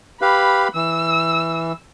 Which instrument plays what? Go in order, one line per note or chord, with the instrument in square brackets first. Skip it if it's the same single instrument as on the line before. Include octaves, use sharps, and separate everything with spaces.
[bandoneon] G4 B4 F5 [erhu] B5
[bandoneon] E3 [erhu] E6